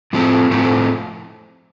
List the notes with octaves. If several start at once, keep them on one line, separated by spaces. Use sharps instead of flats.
A2 F3 A3 C4
A2 F3 A3 C4